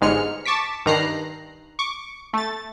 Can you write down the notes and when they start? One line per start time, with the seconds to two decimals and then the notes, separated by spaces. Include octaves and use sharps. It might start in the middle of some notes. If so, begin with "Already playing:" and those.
0.01 G1 G#2 G#3 F6 C#7
0.45 A5 C#6 D6 B6
0.86 G2 D#3 A#5 F#6 C7
1.79 C#6 D6
2.33 A3 A6